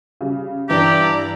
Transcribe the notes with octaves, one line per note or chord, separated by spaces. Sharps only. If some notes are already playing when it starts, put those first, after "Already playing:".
C#3 G3
G2 E3 D4 E4 G4 D5 A#5